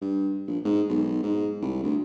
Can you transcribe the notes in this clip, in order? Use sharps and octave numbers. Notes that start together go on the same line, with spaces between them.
G2
A#1
G#2
B1
G#2
C2
D2